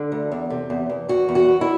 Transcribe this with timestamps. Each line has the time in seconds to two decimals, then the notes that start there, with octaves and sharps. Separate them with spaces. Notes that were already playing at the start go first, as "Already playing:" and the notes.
Already playing: D3
0.12 D2
0.32 E2
0.50 C3
0.70 E2
0.89 E2
1.09 E2 F#4
1.29 E2
1.35 F#4
1.48 E2
1.61 E4